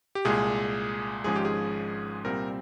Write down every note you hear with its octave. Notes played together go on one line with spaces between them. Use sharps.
G4
C2 A#2 G#3 G#4
G#1 G#2 F3 G#3 C#4 G#4
G4
G#4
C2 A#2 G3 C4 A#4